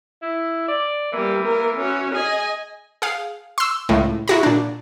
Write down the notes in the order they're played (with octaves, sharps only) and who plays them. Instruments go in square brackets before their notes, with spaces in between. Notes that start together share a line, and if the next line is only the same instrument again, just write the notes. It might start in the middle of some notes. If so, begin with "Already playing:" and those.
[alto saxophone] E4
D5
[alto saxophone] E3 [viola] G3 A#3
[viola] A#3 A#4
C#4 F#4
[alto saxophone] G#4 [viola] D#5 G#5
[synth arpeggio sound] G#4 F5
C6 E6
C#2 A2
E4 F#4 A#5
A#2 D4